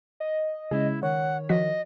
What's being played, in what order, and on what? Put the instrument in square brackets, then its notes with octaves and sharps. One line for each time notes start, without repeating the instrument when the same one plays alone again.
[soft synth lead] D#5
[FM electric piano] C#3 G#3 C#4 [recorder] E4 [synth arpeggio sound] G#4
[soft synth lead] D#3 [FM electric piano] C#5 [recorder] F#5
[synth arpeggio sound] F3 F#4 B6 [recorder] D#5